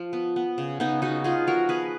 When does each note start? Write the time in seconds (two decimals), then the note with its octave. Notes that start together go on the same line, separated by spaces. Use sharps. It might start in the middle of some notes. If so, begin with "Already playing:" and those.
Already playing: F3
0.13 B3
0.36 B3
0.58 C#3
0.80 C#3 B3 D#4
1.02 B3 D#4 F#4
1.24 B3 F4 G#4
1.47 F3 F#4 A#4
1.69 B3 G#4 B4